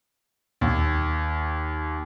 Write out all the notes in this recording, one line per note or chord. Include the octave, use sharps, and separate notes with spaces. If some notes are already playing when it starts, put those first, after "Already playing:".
D#2